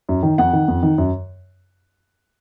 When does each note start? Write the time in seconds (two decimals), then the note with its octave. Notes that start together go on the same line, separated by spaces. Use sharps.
0.09 F#2
0.23 D#3
0.38 F2 F#5
0.53 D#3
0.68 F2
0.83 D#3
0.98 F#2